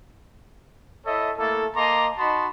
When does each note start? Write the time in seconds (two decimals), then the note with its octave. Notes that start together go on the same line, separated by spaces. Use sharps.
1.06 E4 A4 C#5 D#5 E5
1.38 A3 A#3 E4 A4
1.76 A#3 D#5 A5 A#5 C6 D6
2.17 D#4 F#4 D#5 A5 B5 C6